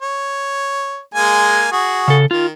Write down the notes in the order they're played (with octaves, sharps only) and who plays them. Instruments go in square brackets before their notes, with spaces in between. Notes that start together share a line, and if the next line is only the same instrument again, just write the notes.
[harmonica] C#5
G#3 A#3 G#5
F#4 G#4
[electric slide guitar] C#3 A4
[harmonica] D#3 [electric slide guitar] F4